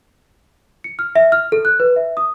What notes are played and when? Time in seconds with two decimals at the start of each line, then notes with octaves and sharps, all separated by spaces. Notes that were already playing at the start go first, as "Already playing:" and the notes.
0.84 C#7
0.99 F6
1.15 E5
1.32 F6
1.52 A4
1.65 F#6
1.80 B4
1.96 E5
2.17 D#6